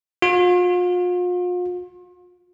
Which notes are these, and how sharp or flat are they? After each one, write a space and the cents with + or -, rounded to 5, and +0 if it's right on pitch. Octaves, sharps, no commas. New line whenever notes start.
F4 +40